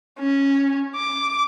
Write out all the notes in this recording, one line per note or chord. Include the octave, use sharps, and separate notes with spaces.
C#4
D6